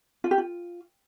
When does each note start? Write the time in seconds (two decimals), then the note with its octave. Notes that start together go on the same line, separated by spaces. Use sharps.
0.24 F4
0.31 G4
0.38 F4